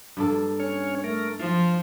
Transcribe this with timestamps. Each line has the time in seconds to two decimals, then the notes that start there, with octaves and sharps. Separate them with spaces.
0.17 G2 A#3 A4
0.60 C#4 C#5
1.04 A3 A#4
1.40 F3 F4